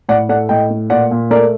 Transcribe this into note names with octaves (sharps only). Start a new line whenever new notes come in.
A2 D5 F#5
A3 D5 F#5
A2 D#5 G5
A3
A#2 D5 F#5
A#2
A3 A#4 D5